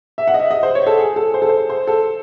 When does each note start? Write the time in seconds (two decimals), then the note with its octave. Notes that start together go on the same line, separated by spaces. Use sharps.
0.18 E5
0.27 F#5
0.34 D#5
0.40 E5
0.51 D#5
0.63 C5
0.75 C#5
0.87 A4
0.99 G#4
1.16 A4
1.34 C5
1.42 A4
1.49 C5
1.70 C5
1.87 A4